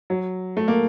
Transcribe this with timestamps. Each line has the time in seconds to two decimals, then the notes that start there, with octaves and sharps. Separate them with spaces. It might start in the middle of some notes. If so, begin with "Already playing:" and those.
0.10 F#3
0.57 A3
0.68 A#3